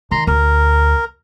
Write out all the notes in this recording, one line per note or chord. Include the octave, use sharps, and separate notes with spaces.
D#3 A#5 C6
D2 A#4